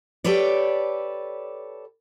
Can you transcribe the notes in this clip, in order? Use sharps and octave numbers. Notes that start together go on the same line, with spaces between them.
G4 A4 B4 C#5 D5